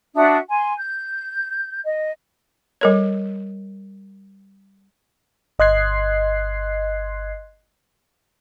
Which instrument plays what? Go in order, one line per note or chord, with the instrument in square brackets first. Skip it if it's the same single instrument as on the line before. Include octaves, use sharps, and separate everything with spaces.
[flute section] D4 F#4 E5 D#6
G#5 C6
G6
D#5
[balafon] G3 A#4 C#5
[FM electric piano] G1 D#5 C6 F#6 G#6 C7